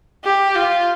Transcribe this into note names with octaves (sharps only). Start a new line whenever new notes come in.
G4
F4